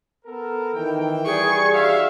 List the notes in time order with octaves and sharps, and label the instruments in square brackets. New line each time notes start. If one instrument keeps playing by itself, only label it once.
[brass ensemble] B3 A4 A#4
[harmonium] D#3 [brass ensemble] E3 G5
[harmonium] G3 [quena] G#4 [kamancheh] C#6
[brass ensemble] D#4 F#4 E5 [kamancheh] F5